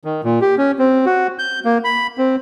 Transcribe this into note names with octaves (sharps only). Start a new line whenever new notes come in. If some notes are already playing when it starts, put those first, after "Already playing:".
D#3
A#2
G4
C#4
C4
F#4
G6
A#3
B5
C4